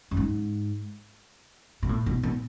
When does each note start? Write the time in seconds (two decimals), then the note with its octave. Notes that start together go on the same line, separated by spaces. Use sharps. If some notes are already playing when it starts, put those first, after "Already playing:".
0.11 F#2
0.17 G#2
1.83 B2
1.89 A2
2.06 B2
2.23 B2